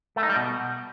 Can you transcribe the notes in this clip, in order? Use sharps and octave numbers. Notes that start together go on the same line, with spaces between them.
A3
D#4
G3
B2